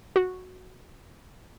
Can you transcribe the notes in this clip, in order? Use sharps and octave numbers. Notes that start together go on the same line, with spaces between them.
F#4